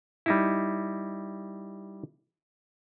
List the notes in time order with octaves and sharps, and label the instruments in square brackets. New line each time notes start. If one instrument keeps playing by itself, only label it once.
[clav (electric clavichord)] G3 D#4 E4